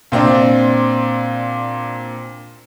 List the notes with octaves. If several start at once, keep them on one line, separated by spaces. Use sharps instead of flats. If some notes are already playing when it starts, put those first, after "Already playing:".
A#2 C4 D4